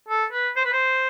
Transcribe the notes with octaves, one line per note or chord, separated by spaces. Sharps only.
A4
B4
C5
B4
C5